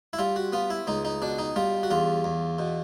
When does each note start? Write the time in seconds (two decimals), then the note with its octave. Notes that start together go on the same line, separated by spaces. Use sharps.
0.13 E4
0.19 G3 F4
0.36 F#4
0.53 B3 F4
0.70 E4
0.87 C#2 D#4
1.05 D#4
1.22 B2 D4
1.39 D#4
1.56 G3 F4
1.83 F#4
1.91 E2 F4
2.24 E2
2.59 B2